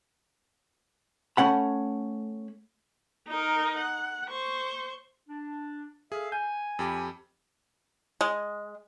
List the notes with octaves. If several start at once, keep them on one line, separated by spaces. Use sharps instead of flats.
A3 C#4 F#5 B5
D#4 A#4
F#5
C5 C#6
D4
G#4 A4 E5 F5
G#5 G6
F2 G4 B5
G#3